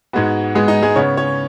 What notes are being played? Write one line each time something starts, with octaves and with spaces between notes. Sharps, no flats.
G#2 G#3 B3 F#4
G#2 G#3 B3 G#4
D#4
G#3 G#4
C#3 B3 C#5
C#4 C#5